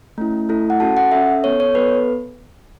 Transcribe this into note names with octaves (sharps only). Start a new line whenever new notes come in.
A3 C#4 E4
A3 E4 A4
F#5
C#4 F#4 A4 A5
F#5
C#4 A4 E5
B3 A4 C#5
C#5
B3 A4 B4